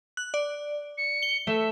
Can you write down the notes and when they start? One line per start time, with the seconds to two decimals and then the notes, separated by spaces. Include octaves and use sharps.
0.17 F#6
0.34 D5
0.98 C#7
1.23 G7
1.47 A3 E5